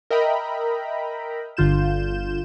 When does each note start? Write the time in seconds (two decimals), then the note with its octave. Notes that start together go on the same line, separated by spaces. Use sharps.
0.10 A#4 D#5 E5 G5 A#5 B5
1.57 G1 D3 F4 G6 E7